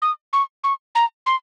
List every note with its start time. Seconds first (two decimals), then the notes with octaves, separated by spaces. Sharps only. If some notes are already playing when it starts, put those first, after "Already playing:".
0.02 D#6
0.33 C#6
0.64 C#6
0.95 A#5
1.26 C6